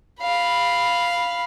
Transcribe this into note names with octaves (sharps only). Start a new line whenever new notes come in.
F5 B5